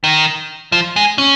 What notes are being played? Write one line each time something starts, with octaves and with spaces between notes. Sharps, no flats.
D#3
F3
G#3
C#4